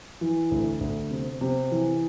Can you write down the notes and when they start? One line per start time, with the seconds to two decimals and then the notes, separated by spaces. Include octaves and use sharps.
0.21 E3
0.51 D2
0.81 D2
1.11 C3
1.41 C3
1.71 E3